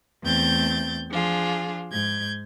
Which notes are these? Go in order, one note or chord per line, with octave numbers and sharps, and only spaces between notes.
E2 A3 C4 G6 A6
F3 D4 F4 G#4
G#2 G6 G#6